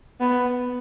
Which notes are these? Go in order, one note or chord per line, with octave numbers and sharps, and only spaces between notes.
B3